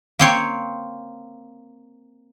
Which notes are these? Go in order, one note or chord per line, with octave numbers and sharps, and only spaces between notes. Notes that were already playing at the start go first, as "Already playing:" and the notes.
A#3 C4 C#5